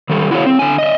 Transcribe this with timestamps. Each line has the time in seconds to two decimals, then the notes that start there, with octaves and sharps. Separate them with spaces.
0.09 D#3 G3 A4
0.31 E4 F#4 G#4 C#5 F5
0.46 C4
0.59 D3 G#5
0.78 D#5 E5